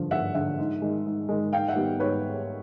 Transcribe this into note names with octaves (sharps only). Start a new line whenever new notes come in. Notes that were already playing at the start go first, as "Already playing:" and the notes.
Already playing: G2 D3 F3
G2 E5 F#5
D3 F3 E5 F#5
G#2
D#3 G#3
G#2
D#3 G#3
G#2 F5 G5
E5 F#5
D#3 G3 B3
G#2 B4 C#5